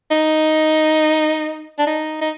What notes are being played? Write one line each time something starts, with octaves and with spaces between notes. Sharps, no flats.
D#4
D4
D#4
D#4